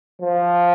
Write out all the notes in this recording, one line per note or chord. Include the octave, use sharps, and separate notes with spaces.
F3